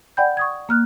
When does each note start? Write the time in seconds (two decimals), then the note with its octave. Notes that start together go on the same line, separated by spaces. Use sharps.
0.17 D5 F#5 G5 B5 G6
0.37 C#6 D#6 G#6
0.69 A#3 F6 F#6